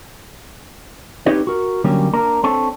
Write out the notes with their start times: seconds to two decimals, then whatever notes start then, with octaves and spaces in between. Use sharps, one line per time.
1.26 C4 D#4 G4 B4 C#5
1.47 F#4 A#4
1.84 D3 F#3 G3 A#3 C#4
2.14 A#3 D4 A#4
2.44 C4 D4 A4 C#5